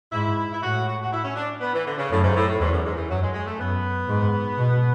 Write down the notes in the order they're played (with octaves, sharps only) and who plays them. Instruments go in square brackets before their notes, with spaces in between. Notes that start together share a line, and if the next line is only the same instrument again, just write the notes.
[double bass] G#2 [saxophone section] E4
[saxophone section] E4
[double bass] A2 [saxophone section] F#4
[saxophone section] F#4
F#4
E4
C#4
D4
B3
E3
D3
C#3
[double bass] F#2 [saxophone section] A2
[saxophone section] G#2
A2
A2
[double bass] E2 [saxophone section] G#2
[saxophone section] F#2
G#2
E3
[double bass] F#2 [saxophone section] F#3
[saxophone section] G#3
G#3
A3
[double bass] F#2 [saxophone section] B3
[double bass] G#2
B2